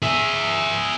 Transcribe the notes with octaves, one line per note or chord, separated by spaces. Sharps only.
G#4 E5